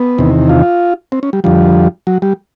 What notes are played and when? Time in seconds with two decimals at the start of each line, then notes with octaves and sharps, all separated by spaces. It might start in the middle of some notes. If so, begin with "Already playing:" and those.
Already playing: B3
0.18 E2 C3 D#3
0.49 F4
1.12 C4
1.23 C#4
1.33 G3
1.44 F2 D3 F3 G3
2.07 F#3
2.22 G3